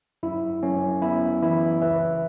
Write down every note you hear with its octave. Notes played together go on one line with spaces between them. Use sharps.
F#2 E4
F#2 C#4
B3 E4
E3 E4
C#2 B4 E5